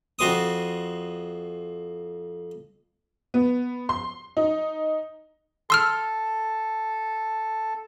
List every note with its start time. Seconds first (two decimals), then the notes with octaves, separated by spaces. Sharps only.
0.19 F2 F#4 C5 D6 D#6
3.34 B3
3.89 C6
4.37 D#4
5.70 A4 C6 E6 F6